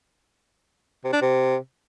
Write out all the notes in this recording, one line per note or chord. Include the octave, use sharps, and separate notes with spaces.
C3
D4
C3